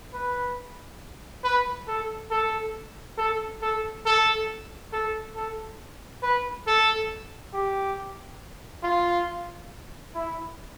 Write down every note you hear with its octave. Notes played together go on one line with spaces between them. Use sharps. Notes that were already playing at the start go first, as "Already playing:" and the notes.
B4
B4
A4
A4
A4
A4
A4
A4
A4
B4
A4
G4
F4
E4